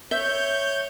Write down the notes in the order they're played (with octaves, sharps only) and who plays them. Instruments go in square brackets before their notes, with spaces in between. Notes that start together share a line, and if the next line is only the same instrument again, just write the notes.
[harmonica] C#5 [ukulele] E5 [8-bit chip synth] G6